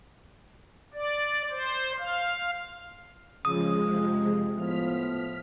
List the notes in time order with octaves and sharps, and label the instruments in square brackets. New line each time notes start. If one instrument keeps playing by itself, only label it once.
[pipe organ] D5
C5
F5
[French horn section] C#3 [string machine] F3 G#3 [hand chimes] D#6
[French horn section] F2 C3
[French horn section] A2 F3 B3 [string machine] F6 B6